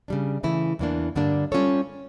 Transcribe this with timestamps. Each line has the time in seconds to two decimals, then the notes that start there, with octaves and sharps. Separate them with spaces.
0.08 C#3 G3 D4
0.43 C#3 E3 A3 E4
0.79 E2 E3 A#3 D4
1.15 G2 D3 G3 A#3 D4
1.52 G3 C#4 F4 A4 C#5